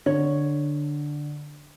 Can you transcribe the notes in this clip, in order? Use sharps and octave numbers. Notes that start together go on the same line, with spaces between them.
D3 C#5